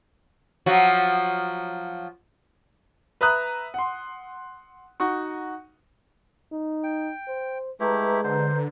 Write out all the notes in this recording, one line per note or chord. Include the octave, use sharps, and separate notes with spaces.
F3 F#3 F#4
B4 E5 A#5 D#6 F#6
F#5 C6
D#4 F#4 C#6
D#4
G5
C5
G#3 A3 E4 G4 B4 A#5
D3 C5